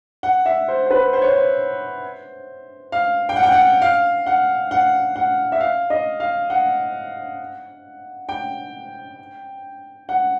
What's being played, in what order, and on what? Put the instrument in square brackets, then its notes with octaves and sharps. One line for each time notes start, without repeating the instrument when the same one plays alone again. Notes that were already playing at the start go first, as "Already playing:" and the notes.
[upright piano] F#5
E5
C5
C5
B4
C5
C#5
C5
F5
G5
F#5
G5
F#5
F5
F#5
F#5
F#5
E5
F5
D#5
F5
F#5
G5
F#5